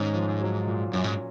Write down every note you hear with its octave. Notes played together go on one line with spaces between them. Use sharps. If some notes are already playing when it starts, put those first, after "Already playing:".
Already playing: G#2 D#3 C#4
F3
F#3
A#2
F#2 C#4
G#2